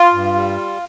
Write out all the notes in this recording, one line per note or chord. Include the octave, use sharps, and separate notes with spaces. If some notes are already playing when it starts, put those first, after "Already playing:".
Already playing: F4
G2
G3